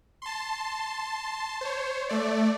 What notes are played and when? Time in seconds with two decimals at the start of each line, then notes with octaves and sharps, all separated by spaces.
0.22 A5 C6
1.61 C5 C#5
2.09 A3 D5